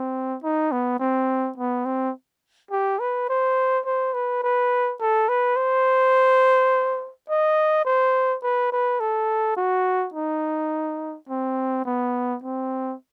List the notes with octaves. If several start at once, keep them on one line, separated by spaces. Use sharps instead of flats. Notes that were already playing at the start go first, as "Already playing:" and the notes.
Already playing: C4
D#4
B3
C4
B3
C4
G4
B4
C5
C5
B4
B4
A4
B4
C5
D#5
C5
B4
B4
A4
F#4
D#4
C4
B3
C4